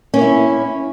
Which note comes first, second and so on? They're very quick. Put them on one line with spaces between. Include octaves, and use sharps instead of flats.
C#4 A#3 C#5 E4